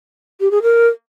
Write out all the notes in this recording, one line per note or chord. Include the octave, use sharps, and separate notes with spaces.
G4
G#4
A#4